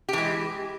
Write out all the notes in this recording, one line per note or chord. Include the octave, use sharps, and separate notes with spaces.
E3 G#3 G4